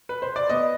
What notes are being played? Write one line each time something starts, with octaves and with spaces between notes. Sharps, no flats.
B4
C5
D5
B3 D#5